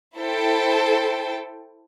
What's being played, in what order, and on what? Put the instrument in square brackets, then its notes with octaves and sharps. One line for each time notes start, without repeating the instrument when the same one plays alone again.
[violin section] E4 A4 C5 G5